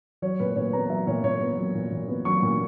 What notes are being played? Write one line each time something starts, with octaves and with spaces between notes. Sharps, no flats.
F#3 C#5
A#2 B4
A#2 C#5
B3 A#5
F#3 E5
A#2 C#5
A#2 C#5
B3
F#3
A#2
A#2
B3
F#3 C#6
A#2